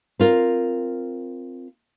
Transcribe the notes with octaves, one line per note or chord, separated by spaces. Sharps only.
C4 F4 A#4